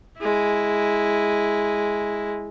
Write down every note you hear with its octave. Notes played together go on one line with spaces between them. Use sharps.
G#3 E4